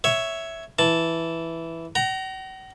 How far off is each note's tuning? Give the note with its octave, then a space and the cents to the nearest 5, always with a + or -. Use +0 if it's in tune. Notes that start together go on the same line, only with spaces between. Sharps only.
C#5 +5 E5 +0
E3 +0 A5 +0
F#5 +45 A#5 +0